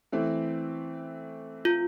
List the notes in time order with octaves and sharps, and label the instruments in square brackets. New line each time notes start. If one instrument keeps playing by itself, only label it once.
[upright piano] E3 A3 C4
[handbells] F4